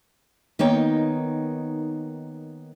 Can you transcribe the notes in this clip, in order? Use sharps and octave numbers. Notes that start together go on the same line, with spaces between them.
D#3 A#3 B3 D#4 C#5 G5